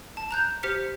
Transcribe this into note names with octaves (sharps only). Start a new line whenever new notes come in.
A5
A#5 F#6 G6
G4 C5 F6 B6 C#7